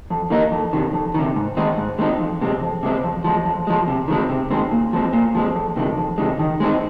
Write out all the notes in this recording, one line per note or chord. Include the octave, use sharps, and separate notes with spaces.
F2
D#3 A#3 D#4
F2
C3 D#3
F2
C3 D#3
G#2
D#3 G#3 C4 D#4
G#2
D#3 G#3 C4 D#4
F2
C3 G#3 C4
F2
C3 G#3 C4
F2
F3 G#3
F2
F3 G#3
C3
D#3 G#3 C4
C3
D#3 G#3 C4
A#2
F3 G#3 C4
A#2
F3 G#3 C4
F2
C3 D#3 G#3
F2
C3 D#3 G#3
D#3
G#3 C4 D#4